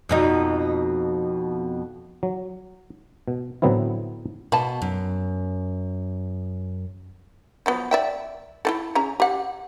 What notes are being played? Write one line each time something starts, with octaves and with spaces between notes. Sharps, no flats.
F2 B2 D#4
F#3
B2
A2 D3 F#3 B3 C4 E4
B2 A#3 B4 A5
F#2
F3 F#3 B3
D5 E5 G5
E4 F4 A4
C#4 G#4 A#5
G4 F#5